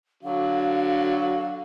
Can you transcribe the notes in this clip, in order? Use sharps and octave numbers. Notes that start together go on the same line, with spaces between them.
D3 F#3 F#4 F5